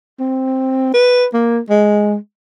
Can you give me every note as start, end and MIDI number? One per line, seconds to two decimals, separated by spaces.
0.20 0.90 60
0.94 1.26 71
1.34 1.59 58
1.70 2.16 56